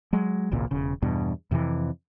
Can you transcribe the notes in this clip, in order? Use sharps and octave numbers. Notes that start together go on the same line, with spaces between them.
F#3 G#3
G#1 C#2 A#2
E1 C#3
E2 G2 B2
F2 C3 D#3 E3